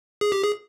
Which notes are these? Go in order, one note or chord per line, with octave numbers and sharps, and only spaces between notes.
G#4
G4
G#4